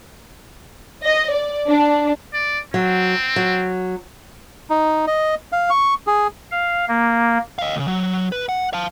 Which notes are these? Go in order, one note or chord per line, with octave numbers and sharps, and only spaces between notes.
D#5
D5
D4
D5
F#3 C4
F#3
D#4
D#5
F5
C#6
G#4
F5
A#3
D#5 F5
D2 C#3
F#3
B4
F#5
F5 A5